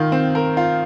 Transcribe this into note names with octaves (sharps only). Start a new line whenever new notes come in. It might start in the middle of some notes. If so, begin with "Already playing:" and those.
Already playing: D#3 F4
C4
A#4
F4